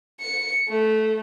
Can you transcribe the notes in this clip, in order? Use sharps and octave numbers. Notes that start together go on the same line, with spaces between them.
C#7
A3